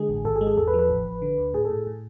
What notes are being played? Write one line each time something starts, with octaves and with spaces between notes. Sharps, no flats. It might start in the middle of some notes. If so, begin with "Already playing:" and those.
Already playing: D3 G#3 G#4
A1
G#1 A4
G#4
G#3
G#4
E2 A4
B4
F3
B4
A1
A1
D3
D2
A2 G#4
A2 A4
A2